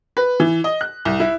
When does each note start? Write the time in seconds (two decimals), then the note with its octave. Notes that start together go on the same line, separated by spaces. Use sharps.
0.17 B4
0.40 E3
0.64 D#5
0.81 F#6
1.05 C2
1.20 E4